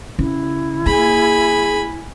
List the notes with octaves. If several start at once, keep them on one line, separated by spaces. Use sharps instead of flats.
C#3 E4
A#3 G#4 G#5 B5